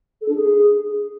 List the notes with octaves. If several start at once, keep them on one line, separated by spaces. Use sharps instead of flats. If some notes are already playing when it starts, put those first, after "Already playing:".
A4
D4
G#4